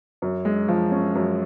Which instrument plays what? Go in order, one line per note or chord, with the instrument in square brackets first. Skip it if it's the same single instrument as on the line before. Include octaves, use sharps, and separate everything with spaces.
[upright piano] F#2
G#3
F3
C#4
F#2